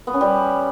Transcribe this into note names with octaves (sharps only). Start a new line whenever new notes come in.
B3
C#4
G3